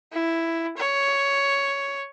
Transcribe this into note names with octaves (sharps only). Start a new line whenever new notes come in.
E4
C#5